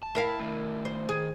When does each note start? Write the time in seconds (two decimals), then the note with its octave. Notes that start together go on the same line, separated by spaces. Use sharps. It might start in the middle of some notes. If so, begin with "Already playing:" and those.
0.03 A5
0.15 E4 A#4 F5
0.40 D#3 A3
0.85 C5
1.09 D#3 G#4